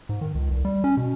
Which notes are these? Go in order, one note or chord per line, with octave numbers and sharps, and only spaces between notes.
G#2
D#3
C#2
C2
G3
C#4
B2